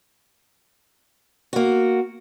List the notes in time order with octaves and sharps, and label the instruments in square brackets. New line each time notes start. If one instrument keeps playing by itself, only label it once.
[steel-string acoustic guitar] A#3 F#4